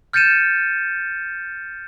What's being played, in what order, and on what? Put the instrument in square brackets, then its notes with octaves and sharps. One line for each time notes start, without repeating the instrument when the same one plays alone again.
[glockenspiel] F6 G6 A6 C#7 D#7 E7